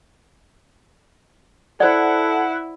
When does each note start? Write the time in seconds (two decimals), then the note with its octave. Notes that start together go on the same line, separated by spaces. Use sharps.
1.80 E4 A4 C5 D5 F#5